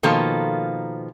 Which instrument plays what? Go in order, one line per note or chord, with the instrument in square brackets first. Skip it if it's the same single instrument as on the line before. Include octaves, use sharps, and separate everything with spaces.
[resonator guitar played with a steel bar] B2 D#3 F3 A#3 F4 A4